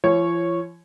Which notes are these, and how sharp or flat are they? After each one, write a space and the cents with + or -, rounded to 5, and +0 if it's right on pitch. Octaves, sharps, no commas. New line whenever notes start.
F3 -45 C#5 -10